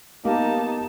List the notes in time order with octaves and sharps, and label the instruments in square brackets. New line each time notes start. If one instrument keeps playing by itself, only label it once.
[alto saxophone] A#3 [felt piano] B3 G4 [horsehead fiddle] D#4 A5